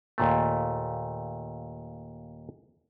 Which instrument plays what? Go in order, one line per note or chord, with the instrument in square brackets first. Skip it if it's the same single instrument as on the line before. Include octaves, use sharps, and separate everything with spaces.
[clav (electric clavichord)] D#2 A#2 A3